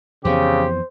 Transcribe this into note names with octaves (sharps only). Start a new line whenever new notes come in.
F2 C#3 E3 B3 G4 C5